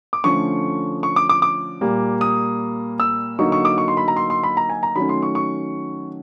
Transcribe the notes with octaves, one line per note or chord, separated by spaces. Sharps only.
D6
D3 F3 A3 C#4 C#6
C#6
D6
D6
D6
A#2 G3 A#3
D#6
E6
D3 F#3 A#3 D#4 C#6
C#6
D6
C#6
C6
B5
A#5
C6
C6
B5
A#5
G#5
A#5
D#3 F#3 A3 C#4 B5
C6
C#6
C#6